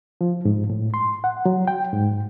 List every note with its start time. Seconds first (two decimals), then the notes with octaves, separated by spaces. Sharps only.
0.21 F3
0.45 G#2
0.70 A2
0.94 C6
1.24 F#5
1.46 F#3
1.68 G5
1.92 G#2